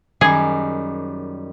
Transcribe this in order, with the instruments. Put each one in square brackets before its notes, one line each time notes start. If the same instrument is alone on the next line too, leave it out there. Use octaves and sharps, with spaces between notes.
[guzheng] F#2 D#3 G3 [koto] G#4